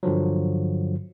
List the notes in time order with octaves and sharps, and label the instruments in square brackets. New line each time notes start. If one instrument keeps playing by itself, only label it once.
[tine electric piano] G2 D3 F3 F#3